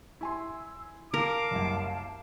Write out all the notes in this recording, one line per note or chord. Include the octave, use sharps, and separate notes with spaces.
E4 G#5 C6 E6
A#4 F5 A5 D6
F#1 C2 F#2